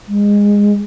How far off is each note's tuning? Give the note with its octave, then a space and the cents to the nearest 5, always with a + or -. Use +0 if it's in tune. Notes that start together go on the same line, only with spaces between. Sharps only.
G#3 -20